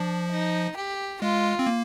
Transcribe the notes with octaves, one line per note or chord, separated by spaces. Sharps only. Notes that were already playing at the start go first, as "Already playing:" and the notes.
Already playing: F3 D4
D#4
G4
G#3 F4
C4
A#3